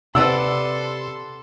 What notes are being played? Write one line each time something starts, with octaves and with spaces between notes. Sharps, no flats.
C3 A4 B4 D5 F#5 C6 E6